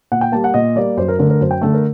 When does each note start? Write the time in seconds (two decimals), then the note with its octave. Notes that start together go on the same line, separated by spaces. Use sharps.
0.12 A#2 F#5
0.21 G5
0.32 G3 A#3 A5
0.44 F#5
0.54 A#2 D#5
0.76 G3 A#3 D5
0.97 F#2 C5
1.08 A#4
1.19 D3 A3 A#4
1.30 A#4
1.41 F#2 C5
1.51 G5
1.61 D3 A3 A4
1.73 A#4